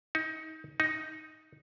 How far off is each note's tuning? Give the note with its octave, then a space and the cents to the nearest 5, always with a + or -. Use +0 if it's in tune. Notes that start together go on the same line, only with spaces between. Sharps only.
D#4 +25
D#4 +5